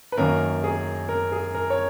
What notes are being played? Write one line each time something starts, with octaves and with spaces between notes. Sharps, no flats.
B4
F#2 D#3 A#3 C#4 A#4
G#4
A#4
G#4
A#4
C#5